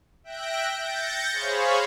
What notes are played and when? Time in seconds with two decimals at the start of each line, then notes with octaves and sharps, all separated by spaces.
0.24 E5 G5 F#6 G6 A#6 D7
0.83 G6 A6 A#6 C#7
1.32 G#4 C5 C#5 F5 B5 C#6